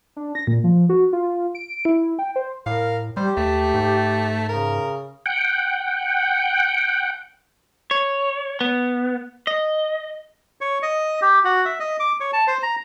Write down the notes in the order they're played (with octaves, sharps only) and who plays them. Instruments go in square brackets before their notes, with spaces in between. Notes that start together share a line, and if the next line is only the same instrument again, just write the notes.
[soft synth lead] D4
A#6
A#2
F3
F#4
F4
D7
E4
G5
C5
[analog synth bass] A2 [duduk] A#4 [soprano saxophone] F5
[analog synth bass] G3 [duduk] G4 [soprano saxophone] C5
[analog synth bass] D#2 [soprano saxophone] A3
[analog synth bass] G#2
[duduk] C#3 [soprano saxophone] A#4
[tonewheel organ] F#5 G5
[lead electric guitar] C#5
B3
D#5
[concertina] C#5
D#5
G4
F#4
E5
D#5
D6
C#5
A5
C5
A#5